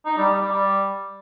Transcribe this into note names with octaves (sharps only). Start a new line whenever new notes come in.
D#4
G3
G3
G3
G3